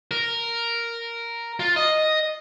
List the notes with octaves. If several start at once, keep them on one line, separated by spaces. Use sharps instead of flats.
A#4
F4
D#5